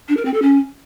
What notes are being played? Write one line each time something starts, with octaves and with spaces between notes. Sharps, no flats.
D4
A#4
C4
A4
C#4